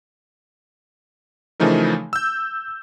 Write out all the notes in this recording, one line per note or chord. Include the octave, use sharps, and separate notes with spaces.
C#3 E3 F3 A3 D#4 A#4
E6 G6